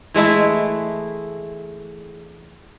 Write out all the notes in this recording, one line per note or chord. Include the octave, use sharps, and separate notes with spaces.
E3 G#3 A3 E4